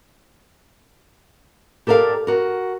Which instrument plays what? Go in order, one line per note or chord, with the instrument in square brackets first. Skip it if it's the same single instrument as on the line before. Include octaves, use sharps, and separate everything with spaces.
[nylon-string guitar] G4 A4 A#4 D5 F5
F#4 A#4